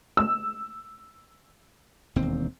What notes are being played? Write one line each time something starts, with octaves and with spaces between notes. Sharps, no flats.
E6
E1 D#2 C4